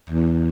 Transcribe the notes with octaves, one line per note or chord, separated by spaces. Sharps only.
E2